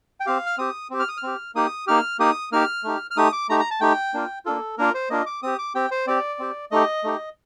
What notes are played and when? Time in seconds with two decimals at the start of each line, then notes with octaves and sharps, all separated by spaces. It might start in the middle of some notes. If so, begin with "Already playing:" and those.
0.20 G5
0.26 C4 G4 F5
0.46 F6
0.58 C4 G4 D#6
0.90 C4 G4
1.00 F6
1.09 D#6
1.17 F6
1.23 C4 G4
1.55 A#3 D#4 G4 D#6
1.87 A#3 D#4 G4 F6
2.19 A#3 D#4 G4 D#6
2.52 A#3 D#4 G4 F6
2.84 A3 D#4 G4
3.11 F6
3.17 A3 D#4 G4 D#6
3.32 D6
3.49 A3 D#4 G4 A#5
3.60 A#5
3.71 A5
3.81 A3 D#4 G4 G5
4.14 A#3 D4 F4
4.46 A#3 D4 F4 A4
4.78 A#3 D4 F4 A#4
4.94 C5
5.10 A#3 D4 F4 D#5
5.26 D6
5.43 C4 G4 D#6
5.58 D6
5.75 C4 G4 G5
5.91 C5
6.07 C4 G4 D5
6.39 C4 G4
6.71 A3 D#4 G4 D#5
7.04 A3 D#4 G4